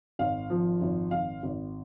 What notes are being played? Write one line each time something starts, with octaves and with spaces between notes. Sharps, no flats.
G#1 F5
F3
G#1
G#1 F5
G#1